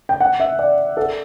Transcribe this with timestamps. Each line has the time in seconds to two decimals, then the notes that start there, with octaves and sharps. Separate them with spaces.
0.09 G5
0.20 F#5
0.40 E5
0.59 D5
0.97 A4